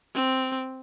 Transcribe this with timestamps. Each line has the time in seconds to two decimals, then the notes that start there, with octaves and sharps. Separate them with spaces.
0.15 C4